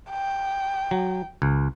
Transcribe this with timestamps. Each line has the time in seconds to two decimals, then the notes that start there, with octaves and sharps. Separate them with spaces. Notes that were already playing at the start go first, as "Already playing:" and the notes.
0.11 G5
0.91 F#3
1.42 C#2